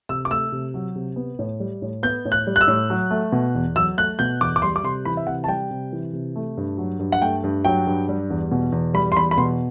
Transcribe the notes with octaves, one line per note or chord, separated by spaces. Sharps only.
C3 E6
D6
A3 E6
C3
F#3
C3
B3
A2
G3
A2
B3 G6
A2
F#6
G3
F#6
E6
A2
F#3
A3
B2
E2
F#3 E6
A3 F#6
B2 G6
E2 D6
D6
G3 C6
D6
C3 C6
E3 B5
E5
C3 F#5
A5
G3 G5
C3
E3
C3
A3
G2
F#3
G2
F#5
A3 G5
G2
F#3 G5
G2
G3
E2
B2
E2
G3 B5
C6
E2 B5
B5
B2 C6